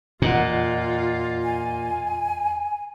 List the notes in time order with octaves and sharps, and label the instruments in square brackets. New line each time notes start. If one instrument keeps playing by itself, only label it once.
[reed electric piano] E2 D#5 F#5 [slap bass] A#2 [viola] F4
[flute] G#5